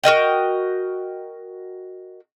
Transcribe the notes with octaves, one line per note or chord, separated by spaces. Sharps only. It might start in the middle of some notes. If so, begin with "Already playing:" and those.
F#4 A#4 D#5 G5